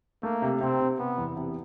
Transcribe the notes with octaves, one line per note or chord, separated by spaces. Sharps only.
A3 A#3
C3
C3 C4
C3
C3 B3
E2
C3